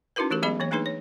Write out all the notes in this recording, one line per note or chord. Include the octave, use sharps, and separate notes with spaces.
C#4 D#4 E4 F#4 A#4 B4
E3 A3 G4 A#4
F#3 G#3 B3 G#4 D#5 B5
E3 A#3 C#5
A3 A#3 D4 D#4 G#4 B4
C#5